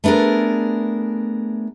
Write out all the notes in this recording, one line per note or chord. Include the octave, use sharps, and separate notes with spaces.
A3 B3 D4 G#4 A#4